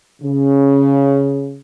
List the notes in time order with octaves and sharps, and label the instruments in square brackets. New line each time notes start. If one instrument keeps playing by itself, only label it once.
[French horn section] C#3